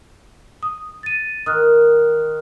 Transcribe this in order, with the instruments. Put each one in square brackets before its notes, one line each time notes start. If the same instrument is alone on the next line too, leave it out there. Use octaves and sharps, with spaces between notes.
[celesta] D#6
A6 D#7
[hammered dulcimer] D#3 [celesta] D#6 F6 F#6